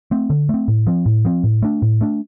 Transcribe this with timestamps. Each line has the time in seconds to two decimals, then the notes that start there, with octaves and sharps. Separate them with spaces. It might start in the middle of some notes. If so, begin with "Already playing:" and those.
0.11 A3 C4
0.30 D3
0.49 A3 C4
0.68 A2
0.87 F3 C4
1.06 A2
1.25 F3 C4
1.44 A2
1.62 A3 D4
1.82 A2
2.01 A3 D4